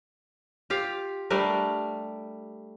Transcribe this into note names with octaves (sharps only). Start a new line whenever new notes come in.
F4 G4 F5
G3 A3 D4 A#4